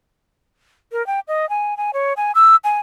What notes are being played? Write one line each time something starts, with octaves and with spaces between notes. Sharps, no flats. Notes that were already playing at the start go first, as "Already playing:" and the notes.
A#4
G5
D#5
G#5
G#5
C#5
G#5
E6
G#5